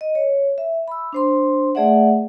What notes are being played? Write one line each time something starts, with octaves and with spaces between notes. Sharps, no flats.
D#5
C#5
E5
B5 E6
D4 C5 C6
A3 G#4 D5 E5 F#5